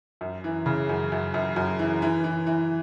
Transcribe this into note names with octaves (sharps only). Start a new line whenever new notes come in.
F#2
E3
C#3
F#2
F#2
F#2
F#2
E3
E3
E3
E3